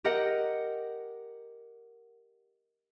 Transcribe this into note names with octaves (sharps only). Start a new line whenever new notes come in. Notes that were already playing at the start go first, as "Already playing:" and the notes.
G4 A#4 D#5 F#5